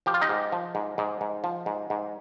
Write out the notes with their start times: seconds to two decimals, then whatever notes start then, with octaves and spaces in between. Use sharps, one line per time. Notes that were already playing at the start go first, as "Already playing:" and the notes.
0.06 F3 G4
0.14 F4
0.21 D#4 G4
0.29 G#2
0.52 F3
0.75 G#2
0.98 G#2
1.21 G#2
1.44 F3
1.66 G#2
1.90 G#2